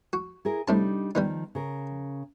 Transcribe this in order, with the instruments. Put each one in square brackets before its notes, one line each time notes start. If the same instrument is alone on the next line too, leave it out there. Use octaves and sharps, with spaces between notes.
[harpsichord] F#4
[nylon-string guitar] E4 G#4 A#4
[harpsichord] A2 C3 A5 [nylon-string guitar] G3 D4 D#4
[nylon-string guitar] D#3 F3 [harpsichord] G3 B3 D#4
[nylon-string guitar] C#3 A#4